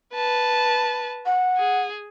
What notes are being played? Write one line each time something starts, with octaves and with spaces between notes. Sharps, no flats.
B4 A5
F#5
G#4